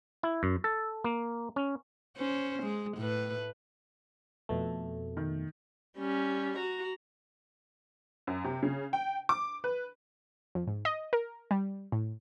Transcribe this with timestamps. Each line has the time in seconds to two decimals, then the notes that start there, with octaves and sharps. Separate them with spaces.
0.23 E4
0.43 F#2
0.64 A4
1.04 A#3
1.56 C#4
2.18 C#4 C5
2.63 G#3
2.97 A2 B4
4.49 F2 B2 A3
5.17 D#3
5.98 G3 C#4
6.59 F#4 A#5
8.27 F#2
8.44 C3
8.63 C#3
8.93 G5
9.29 D6
9.64 B4
10.55 F2
10.67 G#2
10.85 D#5
11.13 A#4
11.51 G3
11.92 A2